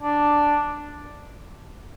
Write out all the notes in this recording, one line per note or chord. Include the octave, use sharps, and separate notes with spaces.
D4